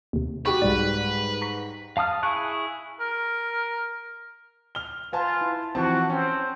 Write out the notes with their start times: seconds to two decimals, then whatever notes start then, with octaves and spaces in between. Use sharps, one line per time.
0.13 D#2 C3
0.45 F#4 G4 B4 C#6
0.62 C2 G#2 G3 D5
1.41 A#5 C#6 B6
1.97 F5 A5 D#6 F6
2.23 E4 G#4 C#6 F#6
3.00 A#4
4.75 F6 G7
5.13 F4 B4 G#5 A5
5.41 E4
5.75 E3 F3 C4 F#4 A5
6.10 C4 C#4